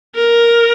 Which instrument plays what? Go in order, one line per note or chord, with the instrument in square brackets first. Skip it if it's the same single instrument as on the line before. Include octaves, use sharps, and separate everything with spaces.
[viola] A#4